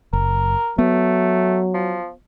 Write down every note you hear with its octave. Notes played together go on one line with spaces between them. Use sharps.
F#1 A#4
F#3 A3 B3
F3